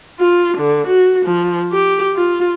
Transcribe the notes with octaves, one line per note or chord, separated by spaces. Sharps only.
F4
D3
F#4
F3
G4
F4